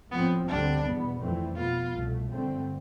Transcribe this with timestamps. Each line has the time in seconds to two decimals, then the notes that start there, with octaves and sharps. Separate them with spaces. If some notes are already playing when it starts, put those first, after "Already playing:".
0.11 A2 F3 B3 C4
0.48 D2 D3 G3 C4 D4
0.84 E2 B2 B3
1.21 F2 E3 A3 C4
1.57 B2 B3 F4
1.94 C2 B2 A3
2.30 G2 D3 A3 C4